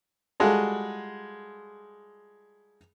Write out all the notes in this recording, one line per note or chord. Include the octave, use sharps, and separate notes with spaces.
G3 G#3 F4 F#4 G#4 A4